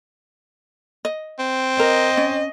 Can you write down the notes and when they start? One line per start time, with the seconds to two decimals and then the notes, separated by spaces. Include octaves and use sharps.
1.05 D#5
1.39 C4
1.79 A#4 D#5
2.17 C#4